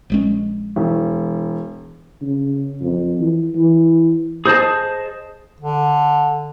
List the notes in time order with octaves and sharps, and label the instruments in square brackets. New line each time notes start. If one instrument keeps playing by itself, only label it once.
[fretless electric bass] A#1 G#3 C#4
[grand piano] E1
[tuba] C#3
F2
E3
E3
[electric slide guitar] G#4 C5 D#5 A5
[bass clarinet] D3